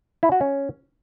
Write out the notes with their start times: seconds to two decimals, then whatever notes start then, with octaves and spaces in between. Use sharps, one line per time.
0.23 E4
0.32 F#4
0.41 C#4